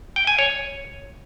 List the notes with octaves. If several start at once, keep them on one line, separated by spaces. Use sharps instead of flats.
G5
G#5
C#5